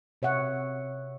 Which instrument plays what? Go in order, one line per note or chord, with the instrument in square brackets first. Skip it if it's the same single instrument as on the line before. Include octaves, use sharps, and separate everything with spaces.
[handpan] C3 C#5 E5 F#5